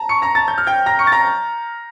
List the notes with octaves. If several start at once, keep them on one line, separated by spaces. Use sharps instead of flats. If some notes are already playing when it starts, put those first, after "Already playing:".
Already playing: A5 A#5
C#6 C#7
A#5 A#6
A5 A6
G6
F6
G5 G6
A#5 A#6
C#6 C#7
A6
A#5 A#6